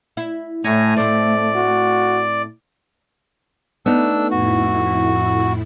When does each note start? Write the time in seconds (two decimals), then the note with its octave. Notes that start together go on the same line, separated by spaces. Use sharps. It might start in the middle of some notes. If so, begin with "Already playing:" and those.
0.17 E4
0.64 A2 A3 C#5 G#5 A#5
0.97 A2 C4 D5
1.56 F#4
3.86 A3 B3 D4 D#4 E6
4.31 F2 A2 E4 F#4